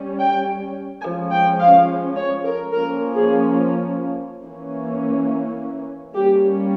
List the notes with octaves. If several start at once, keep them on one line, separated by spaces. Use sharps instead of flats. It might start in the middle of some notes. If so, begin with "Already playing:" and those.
Already playing: G3 C#4
G5
F3 G#3 C#4 G#5
G5
F5
C#5
A#4
F3 A#3 C#4 A#4
G#4
E3 A#3 C#4
G3 A#3 C#4 G4